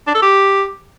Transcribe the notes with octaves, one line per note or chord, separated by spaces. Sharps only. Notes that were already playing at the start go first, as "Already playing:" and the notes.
D4
A4
G4